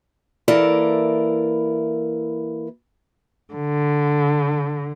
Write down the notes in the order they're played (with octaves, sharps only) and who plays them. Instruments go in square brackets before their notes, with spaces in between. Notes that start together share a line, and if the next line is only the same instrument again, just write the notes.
[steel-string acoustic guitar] E3 A#3 E4 A4 A#4 D5
[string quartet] D3